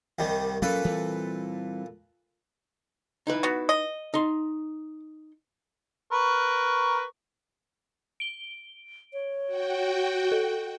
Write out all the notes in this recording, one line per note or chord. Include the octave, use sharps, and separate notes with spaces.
C2 D#3 G3
A#2 F#3 C4 C#4 A4 B4
E3 G3 C4
D#4 E4 B4
B3 F#4
D#5
D#4 C6
A#4 B4 C#6
D7 G7
C#5
F#4 G5
A4